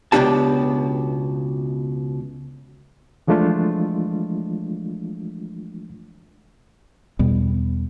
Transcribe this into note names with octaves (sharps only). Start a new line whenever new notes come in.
C#2 B2 A3 D4 G4 A5
E3 F3 G#3 A3 D4 F4
E2 B2 G3 B3